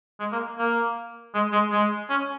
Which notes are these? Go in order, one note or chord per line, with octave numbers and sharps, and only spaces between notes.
G#3
A#3
A#3
G#3
G#3
G#3
C#4